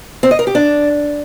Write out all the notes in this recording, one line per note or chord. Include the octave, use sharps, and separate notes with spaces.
C4
D#5
A#4
G4
D4